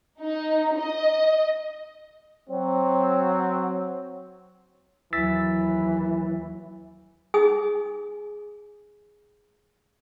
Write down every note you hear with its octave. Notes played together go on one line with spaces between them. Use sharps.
D#4
D#5
F#3 C4
D#2 E3 F#3 E6 A6 B6
D#4 G#4 G#5 D#6